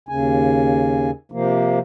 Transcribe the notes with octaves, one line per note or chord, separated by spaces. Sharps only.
D#2 C#3 G#5
C3 F3 A#3